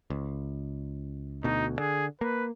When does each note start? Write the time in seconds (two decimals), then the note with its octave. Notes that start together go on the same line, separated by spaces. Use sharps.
0.10 C#2
1.44 D2 B2 D#4
1.79 D3 G#4
2.21 A#3 B4